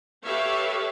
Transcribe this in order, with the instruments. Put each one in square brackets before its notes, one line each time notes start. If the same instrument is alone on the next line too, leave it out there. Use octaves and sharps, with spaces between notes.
[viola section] G4 A4 B4 C#5 E5 F5